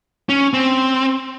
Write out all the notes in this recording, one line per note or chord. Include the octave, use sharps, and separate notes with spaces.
C#4
C4